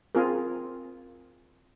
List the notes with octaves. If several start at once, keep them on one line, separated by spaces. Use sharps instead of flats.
C4 F4 G#4 A#4